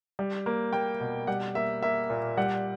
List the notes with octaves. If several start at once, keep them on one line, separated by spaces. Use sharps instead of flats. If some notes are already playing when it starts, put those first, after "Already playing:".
G3
A#3
A#3 G5
B2
G3 F#5
A#3 E5
A#3 E5
A#2
G3 F#5